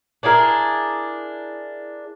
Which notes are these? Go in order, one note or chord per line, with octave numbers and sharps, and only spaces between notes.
D4 E4 G#4 A#4